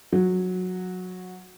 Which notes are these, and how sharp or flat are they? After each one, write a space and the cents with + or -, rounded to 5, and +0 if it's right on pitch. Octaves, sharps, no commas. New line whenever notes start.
F#3 -15